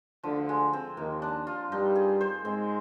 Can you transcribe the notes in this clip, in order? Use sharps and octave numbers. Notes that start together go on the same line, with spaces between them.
D2 D3 F3
G#3
C4
D#2 D#3 A#3
D4
F4
G2 G3 D#4
G#4
C5
G#2 G#3 C4